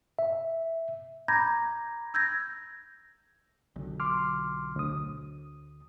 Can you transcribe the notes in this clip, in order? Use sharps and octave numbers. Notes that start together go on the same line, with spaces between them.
E5
A#5 B5 D6 G6 G#6 A#6
E6 G6 G#6 A#6
B1 D3
C6 D6 F6
D2 D#6